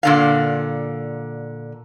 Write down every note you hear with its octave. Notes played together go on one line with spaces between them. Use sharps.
A#2 D3 F5